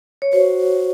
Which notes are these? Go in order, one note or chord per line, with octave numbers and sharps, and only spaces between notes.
C#5
F#4 C5